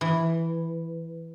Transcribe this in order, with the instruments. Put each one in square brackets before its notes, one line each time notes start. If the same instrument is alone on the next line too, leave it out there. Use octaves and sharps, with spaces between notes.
[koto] E3